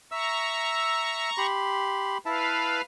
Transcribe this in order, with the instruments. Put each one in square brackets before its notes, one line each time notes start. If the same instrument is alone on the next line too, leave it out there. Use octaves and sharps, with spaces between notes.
[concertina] E5 E6 [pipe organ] A#5 C#6
[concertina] G4 B5 C6
[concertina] E4 E5 A5 [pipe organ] B4 F5